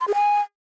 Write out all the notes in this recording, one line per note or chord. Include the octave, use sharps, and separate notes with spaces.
C6
G#4
G#5